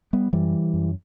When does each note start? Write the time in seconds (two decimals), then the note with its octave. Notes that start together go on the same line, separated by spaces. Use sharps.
0.13 G3 B3
0.33 F#2 E3 G3
0.74 F#2